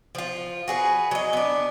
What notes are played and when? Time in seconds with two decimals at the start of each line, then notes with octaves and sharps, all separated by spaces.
0.15 F3 F4
0.68 F#4 G#4 B4
1.11 F#3 D#5
1.33 B3 D4